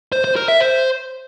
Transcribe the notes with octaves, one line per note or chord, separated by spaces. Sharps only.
C5
C5
A#4
E5
C5